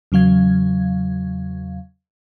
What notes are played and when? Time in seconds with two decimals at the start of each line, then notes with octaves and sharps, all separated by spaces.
0.12 E2 C#3 F#3 F5 G#6